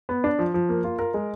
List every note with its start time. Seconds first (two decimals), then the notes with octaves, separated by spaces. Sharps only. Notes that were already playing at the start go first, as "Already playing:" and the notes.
0.09 B3
0.24 D4
0.39 F3
0.54 F3
0.69 A#3
0.84 F4
0.99 A#4
1.14 G#3